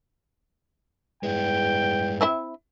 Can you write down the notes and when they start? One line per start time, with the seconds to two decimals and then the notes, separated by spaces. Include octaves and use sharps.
1.23 E2 G2 G#3 G5
2.21 C4 E4 E5